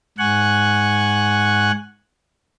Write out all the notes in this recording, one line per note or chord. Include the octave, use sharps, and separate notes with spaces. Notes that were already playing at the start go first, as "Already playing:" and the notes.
G#2 F#5 G#5 C#6 F#6